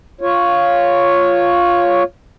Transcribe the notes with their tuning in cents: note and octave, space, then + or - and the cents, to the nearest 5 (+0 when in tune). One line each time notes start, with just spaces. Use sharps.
F4 +0 C#5 +0